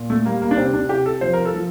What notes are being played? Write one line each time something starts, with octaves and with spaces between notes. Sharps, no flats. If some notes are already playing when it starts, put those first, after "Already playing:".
Already playing: A#2
A3
G3 A#3
A#3
D4
C3 C4
D4
C3 G4
A4
F3 C5
A#4
A4
F3